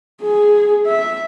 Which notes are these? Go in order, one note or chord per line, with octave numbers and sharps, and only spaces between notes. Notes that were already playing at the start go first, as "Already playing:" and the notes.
G#4
E5